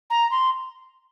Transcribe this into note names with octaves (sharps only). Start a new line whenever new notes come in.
A#5
C6